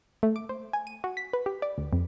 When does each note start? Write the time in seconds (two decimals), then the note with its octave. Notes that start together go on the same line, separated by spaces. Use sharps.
0.23 A3
0.36 D6
0.49 C5
0.73 G#5
0.87 D#7
1.04 F#4
1.17 B6
1.33 B4
1.46 G4
1.62 D5
1.78 D2
1.93 F2